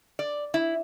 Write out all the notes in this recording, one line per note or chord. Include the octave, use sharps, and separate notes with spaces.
D5
E4